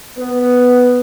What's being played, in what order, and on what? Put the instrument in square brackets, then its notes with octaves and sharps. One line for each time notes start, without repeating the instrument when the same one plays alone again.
[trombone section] B3